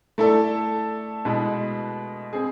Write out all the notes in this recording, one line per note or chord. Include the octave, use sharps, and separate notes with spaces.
A3 E4 A4 D5
B2 G#3 B3 E4 B4
C4 G#4